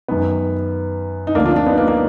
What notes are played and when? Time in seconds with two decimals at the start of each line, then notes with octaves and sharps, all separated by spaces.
0.08 F#2 D#3 B3
1.27 D#4
1.35 D2 D3 F3 A#3 D4
1.46 D4 F4
1.56 D4 F4
1.66 B3 D#4
1.77 A#3 D4
1.88 A#3